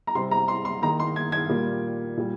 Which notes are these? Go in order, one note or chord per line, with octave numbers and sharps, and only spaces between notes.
A#5
C3 G3 C4 C6
A#5
C6
C6
D#3 A#3 D#4 A#5
C6
G#6
G#6
A#2 G3 A#3
A#2 G3